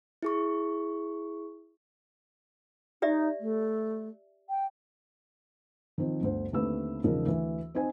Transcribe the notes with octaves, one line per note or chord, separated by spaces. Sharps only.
E4 G#4 C#6
D#4 G4 D5 E5
A3
G5
D#3 F3 C4
G1 D2 C5
D#2 D3 A3 C4 B4 E6
E1 C#3 F3 D#4 A#4
D2 E3
C4 D#4 C5 G#5